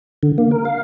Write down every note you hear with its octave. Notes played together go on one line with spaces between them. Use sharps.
D3
A#3
A#4
F5